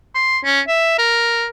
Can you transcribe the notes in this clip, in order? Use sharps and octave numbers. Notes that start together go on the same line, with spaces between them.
C6
C#4
E5
A#4